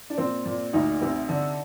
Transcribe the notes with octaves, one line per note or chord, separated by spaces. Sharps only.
D4
A#2 C4
A#2
D2 D#4
C3
D3